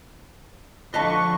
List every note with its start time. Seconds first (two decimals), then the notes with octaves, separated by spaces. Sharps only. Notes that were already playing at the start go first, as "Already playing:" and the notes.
0.94 D3 F3 B4 D#5 F5 A5 C#6